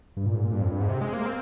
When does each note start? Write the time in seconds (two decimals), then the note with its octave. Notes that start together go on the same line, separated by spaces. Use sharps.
0.17 G2
0.26 A#2
0.35 G#2
0.44 A#2
0.53 G2
0.62 F2
0.71 G2
0.80 G#2
0.89 C3
1.01 G#3
1.13 A#3
1.26 C4